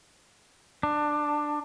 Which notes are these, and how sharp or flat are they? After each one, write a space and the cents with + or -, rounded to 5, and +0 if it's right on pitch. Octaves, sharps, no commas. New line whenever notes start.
D4 +15